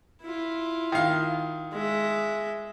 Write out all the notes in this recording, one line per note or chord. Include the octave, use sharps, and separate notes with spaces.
E4 F4
D#3 F5
G#3 E5